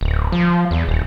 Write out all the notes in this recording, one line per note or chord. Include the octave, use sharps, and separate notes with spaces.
D1
F3
E2
D#1